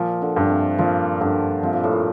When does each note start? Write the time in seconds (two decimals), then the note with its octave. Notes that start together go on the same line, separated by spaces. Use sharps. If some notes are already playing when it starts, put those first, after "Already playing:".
Already playing: A#2 F3
0.22 D3
0.36 G2
0.50 C3
0.78 A#2 F3
1.21 G2 D3
1.63 C3 F3
1.73 A#2
1.84 A2
1.92 A#2